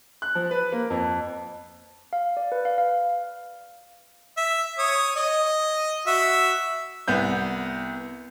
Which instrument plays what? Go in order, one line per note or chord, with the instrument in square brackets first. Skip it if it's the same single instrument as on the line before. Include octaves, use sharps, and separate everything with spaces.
[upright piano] F#6
F3
B4
A#3
F2
[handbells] F5
D5
B4
F5
F5
[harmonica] E5
C#5 D#6
D#5
F#4 E5
[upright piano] C2 B3 G6